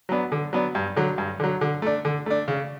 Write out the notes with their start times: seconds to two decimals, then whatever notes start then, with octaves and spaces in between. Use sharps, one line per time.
0.09 F#3 B3 D4
0.32 D3
0.53 F#3 B3 D4
0.75 G2
0.96 D3 F#3
1.18 G2
1.40 D3 F#3
1.61 D3
1.82 A3 D4
2.05 D3
2.26 A3 D4
2.48 C#3